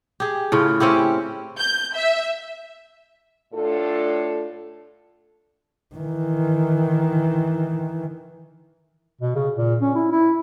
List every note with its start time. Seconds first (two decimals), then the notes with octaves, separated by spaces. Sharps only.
0.20 G4 G#4
0.52 A2 C#3 F4
0.80 C4 C#4 E4 G4
1.58 G6
1.95 E5
3.53 A2 D4 F4 A4
5.95 D#3 E3
9.21 B2
9.35 C#3
9.57 A#2
9.81 C#4
9.95 E4
10.12 E4